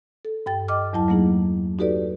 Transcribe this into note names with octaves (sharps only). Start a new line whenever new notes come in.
A4
G2 G5 A6
D#5 G5 D6 F6
E2 F#3 E4 A5
F#3 A3 A#3 D#4 G#4
D#4 F#4 G4 A4 B4 D5